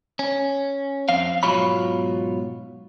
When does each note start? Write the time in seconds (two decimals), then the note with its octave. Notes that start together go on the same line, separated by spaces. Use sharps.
0.19 C#4
1.09 F2 C4 F5
1.43 G#2 B2 F#3 F4 C#5 B5